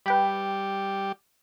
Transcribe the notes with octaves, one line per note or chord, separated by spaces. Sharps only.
G3 G4 B4 G5 B5